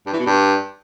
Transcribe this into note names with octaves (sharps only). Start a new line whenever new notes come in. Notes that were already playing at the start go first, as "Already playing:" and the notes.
G2
E3
B2
G2